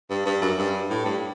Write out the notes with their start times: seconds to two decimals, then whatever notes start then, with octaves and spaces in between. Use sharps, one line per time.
0.10 G2
0.26 G2
0.42 F#2
0.58 G2
0.90 A2
1.05 G2